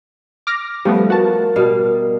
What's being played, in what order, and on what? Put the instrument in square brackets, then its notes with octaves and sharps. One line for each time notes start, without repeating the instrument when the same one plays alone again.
[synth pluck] D6 F6 A#6
[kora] F3 [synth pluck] G3 A3 B3
[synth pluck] F#4 A5 [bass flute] A#4
[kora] B2 G3 F5